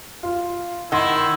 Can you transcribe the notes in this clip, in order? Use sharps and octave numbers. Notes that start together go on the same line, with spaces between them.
F4
D#3 E4 F#5 C6